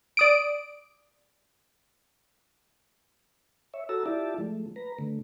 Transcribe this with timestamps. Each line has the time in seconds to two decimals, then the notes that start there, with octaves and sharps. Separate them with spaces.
0.17 D5 D#6 D7
3.74 C#5 E5
3.89 F#4 A4 A5 A#5 E6
4.06 E4 F4 G4 D5 E5 A5
4.38 F3 G#3 A3
4.76 B4 A#5
4.99 D3 A3